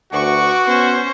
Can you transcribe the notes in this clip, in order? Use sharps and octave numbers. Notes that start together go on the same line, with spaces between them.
D2 F#4 B4 C#6 D6
B3 C#4 C5 C#6